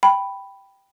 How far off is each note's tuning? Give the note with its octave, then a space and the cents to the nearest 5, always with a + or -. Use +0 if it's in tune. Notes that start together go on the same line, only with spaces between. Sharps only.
G5 +0 B5 +0